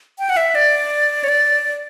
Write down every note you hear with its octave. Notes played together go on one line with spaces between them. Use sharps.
G5
F#5
E5
D5
C#5
D5